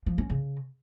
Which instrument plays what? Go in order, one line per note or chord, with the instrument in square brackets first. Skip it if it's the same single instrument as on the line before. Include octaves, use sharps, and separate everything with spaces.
[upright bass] F3
C#4
C#3